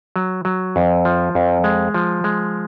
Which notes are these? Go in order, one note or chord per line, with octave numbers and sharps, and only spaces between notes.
F#3
F#3
F2
F3
F2
G#3
F3
G#3